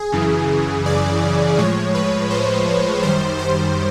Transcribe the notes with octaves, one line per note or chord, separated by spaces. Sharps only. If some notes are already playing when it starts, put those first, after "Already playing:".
Already playing: G#4
F#2 C#3 E3
D5
A2 F3 G#3 C#5
B4
C5
F#2 D#3 G3 C5
C5